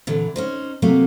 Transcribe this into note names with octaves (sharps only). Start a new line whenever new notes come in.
A#2 D3 E3
C#4 D#4 C5
C3 F#3 A3 A#3